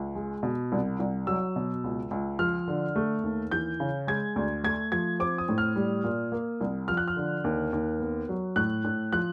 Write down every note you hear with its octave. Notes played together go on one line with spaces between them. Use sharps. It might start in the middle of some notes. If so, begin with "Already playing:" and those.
Already playing: C#2
G#3
B2
C2
C2
F#3 E6
B2
C#2
C#2
F3 F6
D3
A3
D#2
E3 G6
C#3
G#3 G#6
D2
A3 G#6
F3 G#6
C4 D6
D#6
A2
F6
G3
A#2
A#3
C2
F3 F6
F#6
F6
D3
D#2
D#2
B3
F#3
A2 F#6
A2
F3 F#6